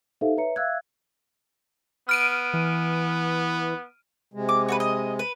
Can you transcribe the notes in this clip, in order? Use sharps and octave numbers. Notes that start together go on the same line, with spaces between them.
D#4 G4 A4 C5 E5 F5
B4 C#5 E5 A#5 C#7
E5 F5 E6 F#6 G#6
B3 F6 D7 D#7
E3
C3 G#3
D6
F#4 A4 B4
D#5
B4